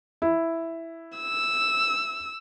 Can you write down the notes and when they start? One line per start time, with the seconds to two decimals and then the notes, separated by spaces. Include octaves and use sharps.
0.22 E4
1.18 E6